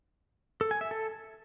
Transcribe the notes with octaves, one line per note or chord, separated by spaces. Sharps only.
A4
G#5
E5
A4